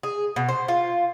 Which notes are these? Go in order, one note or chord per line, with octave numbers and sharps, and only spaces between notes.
G#4
B2
C5
F4